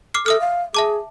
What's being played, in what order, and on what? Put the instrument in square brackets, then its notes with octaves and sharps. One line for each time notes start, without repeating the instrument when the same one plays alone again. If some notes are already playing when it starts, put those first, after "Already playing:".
[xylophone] D6 F6 C7
[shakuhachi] A4 [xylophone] E5 D#6 F6
[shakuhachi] F5
[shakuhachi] G#4 [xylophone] E5 A5 D6